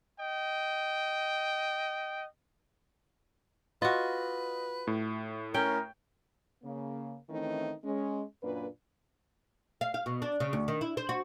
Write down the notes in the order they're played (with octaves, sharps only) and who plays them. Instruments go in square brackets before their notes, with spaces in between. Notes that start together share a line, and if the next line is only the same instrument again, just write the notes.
[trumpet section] D#5 G5
[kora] F4 F#4 [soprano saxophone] B4 [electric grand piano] D#5
[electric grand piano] A2
[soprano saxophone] C#4 [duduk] A#4 [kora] G5
[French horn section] C#3 A#3
D#3 E3 A3 C4 C#4 D#4
G#3 C#4
F#2 A#2 A#3 D4 B4
[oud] F5
F5
B2
D4
C#3
D2
D#3
E4
C5
F#4